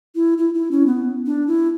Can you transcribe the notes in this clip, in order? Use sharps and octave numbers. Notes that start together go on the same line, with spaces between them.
E4
E4
E4
C#4
B3
D4
E4